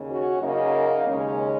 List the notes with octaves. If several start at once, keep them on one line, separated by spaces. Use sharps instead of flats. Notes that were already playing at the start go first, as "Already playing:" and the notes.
Already playing: D#2 C#3
C#4 F#4
F#2 C#3 A#3 D#4
D#2 C#3 G#3 C#4